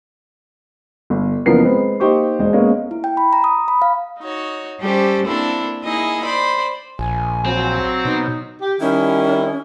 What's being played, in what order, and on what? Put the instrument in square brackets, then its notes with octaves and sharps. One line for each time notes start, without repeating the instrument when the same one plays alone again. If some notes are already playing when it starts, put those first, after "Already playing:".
[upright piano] G1
F#1 E3 F3 B3 A#4 C7
G#3 C4 B4
A#3 D#4 G4 C5 C#6
E1 G#3 C5
G#3 A#3 B3 C#4
[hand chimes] E4
G5
B5
A#5
D#6
B5
F5
[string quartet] D#4 F#4 C#5
G3 C#4 G4 A4 C5
A#3 C4 D4 E4 A4
A#3 D#4 E4 G#4 D#5
C5 D5 B5
[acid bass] A#1 [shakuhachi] G#5
[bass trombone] F#3 [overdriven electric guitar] C4
[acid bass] B2 [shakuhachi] D#4
[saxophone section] G4
[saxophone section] D#3 G3 E4 [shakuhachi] C#4